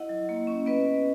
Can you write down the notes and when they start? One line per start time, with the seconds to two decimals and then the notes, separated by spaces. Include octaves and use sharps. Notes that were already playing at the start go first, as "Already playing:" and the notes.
Already playing: E4 D#5 F#5
0.09 F#3
0.29 A#3
0.47 C#4
0.66 B3 B4 D#5
0.85 B3